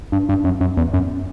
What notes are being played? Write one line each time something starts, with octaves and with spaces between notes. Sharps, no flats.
G2
G2
F#2
F#2
E2
F#2